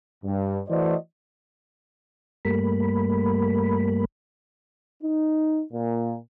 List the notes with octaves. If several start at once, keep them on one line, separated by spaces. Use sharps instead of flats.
G2
E3 A3 F#4 C5 D5 D#5
G2 G3 A3 A#3 A#4 B5
D#4
A#2